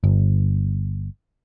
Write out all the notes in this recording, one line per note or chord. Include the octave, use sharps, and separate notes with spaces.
G1